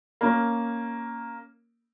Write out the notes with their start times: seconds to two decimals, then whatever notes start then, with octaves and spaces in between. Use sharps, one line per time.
0.21 A#3 C#4